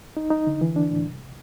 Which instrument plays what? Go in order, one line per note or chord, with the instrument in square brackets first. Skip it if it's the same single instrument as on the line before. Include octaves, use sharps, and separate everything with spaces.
[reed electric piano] D#4
D#4
D3
E3
D4
A2
C2